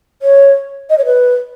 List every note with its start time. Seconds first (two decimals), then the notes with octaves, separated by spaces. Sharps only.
0.22 C#5
0.90 D#5
0.98 C#5
1.06 B4